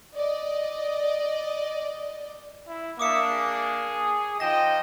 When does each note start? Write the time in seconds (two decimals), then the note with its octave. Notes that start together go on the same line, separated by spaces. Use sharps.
0.16 D5 D#5
2.67 E4
2.99 A#3 D4 E5 D6 D#6 C#7
3.30 G#4
4.40 F3 D#4 D#5 G5 A#6 E7